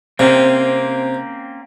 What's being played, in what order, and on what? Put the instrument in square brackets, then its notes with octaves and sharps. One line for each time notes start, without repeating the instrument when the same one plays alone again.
[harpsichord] C3 [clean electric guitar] A#3 C4 C#4